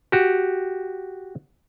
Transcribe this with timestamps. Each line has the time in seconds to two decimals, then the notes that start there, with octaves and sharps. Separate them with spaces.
0.12 F#4 G4